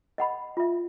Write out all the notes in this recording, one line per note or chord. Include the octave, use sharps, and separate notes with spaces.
D#5 F#5 B5
F4 E5